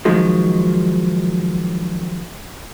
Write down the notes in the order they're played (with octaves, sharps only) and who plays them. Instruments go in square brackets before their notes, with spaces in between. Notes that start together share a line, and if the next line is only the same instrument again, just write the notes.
[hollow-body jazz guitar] D#3 F3 F#3 G#3